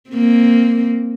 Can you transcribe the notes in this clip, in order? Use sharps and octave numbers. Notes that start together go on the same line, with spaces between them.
A#3 C4